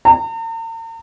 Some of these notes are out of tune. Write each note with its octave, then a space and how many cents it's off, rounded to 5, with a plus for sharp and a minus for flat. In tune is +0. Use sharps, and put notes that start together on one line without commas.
A#5 -45